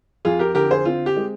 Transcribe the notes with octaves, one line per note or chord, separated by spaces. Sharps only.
F2 F4 G#4
G4 A#4
D3 G4 A#4
G#4 C5
C4 F4
G4
G#3